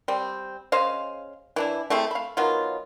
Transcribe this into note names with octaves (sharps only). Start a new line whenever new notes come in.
G3 C4
C#3 C5 D#5 F5
E3 D4 E4
A3 C4 E4 G#4
F5 B5
D#3 F#3 B3 F4